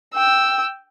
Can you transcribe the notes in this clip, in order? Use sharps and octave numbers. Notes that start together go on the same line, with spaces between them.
G5 E6